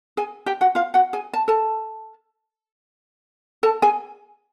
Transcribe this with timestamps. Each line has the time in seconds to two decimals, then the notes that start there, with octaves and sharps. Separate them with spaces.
0.17 G#4 G#5
0.46 G4 G5
0.61 F#4 F#5
0.75 F4 F5
0.94 F#4 F#5
1.13 G#4 G#5
1.33 A5
1.48 A4 A5
3.63 A4 A5
3.82 G#4 G#5